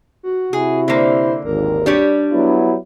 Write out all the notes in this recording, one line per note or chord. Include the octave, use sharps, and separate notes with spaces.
F#4
C3 E4 G#4
D3 A#3 C5
G#1 D#2 A#4
G3 D4 G4 C#5
F#3 B3 E4